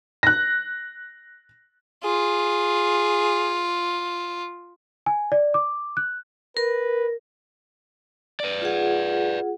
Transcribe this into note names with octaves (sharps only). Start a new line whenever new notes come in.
F#6 A#6
F4 G#4
G#5
D5
D6
F#6
A#4 B4
B4 D5
F4 G#4 F#5